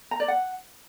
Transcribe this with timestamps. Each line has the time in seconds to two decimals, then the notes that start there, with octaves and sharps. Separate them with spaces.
0.11 A#5
0.20 D5
0.28 F#5